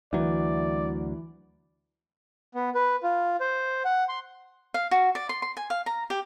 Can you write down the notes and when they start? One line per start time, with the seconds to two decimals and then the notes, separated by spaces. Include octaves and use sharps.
0.13 D2 E3 F#3 D5
2.54 B3
2.75 B4
3.03 F4
3.41 C5
3.85 F#5
4.09 C6
4.74 F5
4.91 F#4
5.15 D5
5.29 C6
5.42 C6
5.57 G#5
5.70 F5
5.86 A#5
6.10 G4